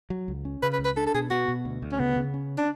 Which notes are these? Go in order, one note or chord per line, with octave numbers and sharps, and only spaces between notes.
F#3
C#2
C#4
C#3 B4
B4
C#2
B4
D4 A4
A4
B2 G#4
B3 F#4
B2
D2
D2
C#4
C#3 B3
C#3
C#4
D4